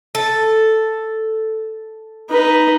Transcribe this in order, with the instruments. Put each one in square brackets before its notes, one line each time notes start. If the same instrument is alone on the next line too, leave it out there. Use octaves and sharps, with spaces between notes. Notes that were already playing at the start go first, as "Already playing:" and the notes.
[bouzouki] A4
[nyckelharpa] D#4 B4